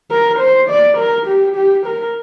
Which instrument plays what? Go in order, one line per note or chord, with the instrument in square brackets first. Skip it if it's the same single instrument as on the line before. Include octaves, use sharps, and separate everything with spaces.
[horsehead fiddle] A#4
C5
D5
A#4
G4
G4
A#4